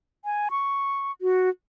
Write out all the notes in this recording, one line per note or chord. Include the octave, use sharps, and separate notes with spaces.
G#5
C#6
F#4